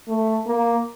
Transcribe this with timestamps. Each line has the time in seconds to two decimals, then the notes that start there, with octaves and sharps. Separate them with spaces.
0.08 A3
0.47 A#3